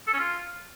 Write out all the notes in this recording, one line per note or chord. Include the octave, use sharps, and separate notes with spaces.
A4
C#4
F4